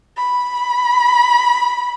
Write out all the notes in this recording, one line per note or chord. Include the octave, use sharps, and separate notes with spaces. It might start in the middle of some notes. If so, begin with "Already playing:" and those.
B5